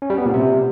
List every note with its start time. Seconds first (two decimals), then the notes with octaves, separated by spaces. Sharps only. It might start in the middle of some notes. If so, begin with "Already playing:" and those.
0.02 C#4
0.10 G3
0.18 B3
0.26 A#2
0.34 C3